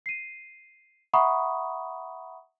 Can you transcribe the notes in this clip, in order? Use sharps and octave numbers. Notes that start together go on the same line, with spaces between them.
C7 D#7
E5 F#5 A#5 B5 C#6 D#6